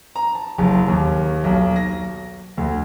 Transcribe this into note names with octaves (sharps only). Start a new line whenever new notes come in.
A#5
A5
F#1
D#2
B1
A#6
D2